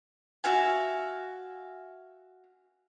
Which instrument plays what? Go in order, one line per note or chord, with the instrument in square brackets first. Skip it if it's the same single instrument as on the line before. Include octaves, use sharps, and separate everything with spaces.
[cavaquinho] F#4 E5 F5 G#5